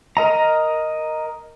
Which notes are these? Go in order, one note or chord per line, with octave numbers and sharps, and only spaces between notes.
A#4 D#5 A#5